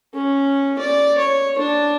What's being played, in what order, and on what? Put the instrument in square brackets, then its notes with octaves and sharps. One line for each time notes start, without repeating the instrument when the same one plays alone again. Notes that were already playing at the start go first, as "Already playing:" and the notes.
[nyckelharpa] C#4
D5
C#5
D4